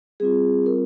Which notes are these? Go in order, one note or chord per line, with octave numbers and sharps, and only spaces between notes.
G3 C4 F4 G#4
A#4